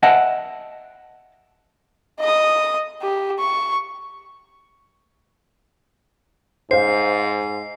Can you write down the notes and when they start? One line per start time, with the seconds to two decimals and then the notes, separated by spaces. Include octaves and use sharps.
0.03 D#5 E5 F#5 A5
2.20 D#5 D#6
3.02 G4
3.39 C#6
6.71 G#2 C5 F5 C7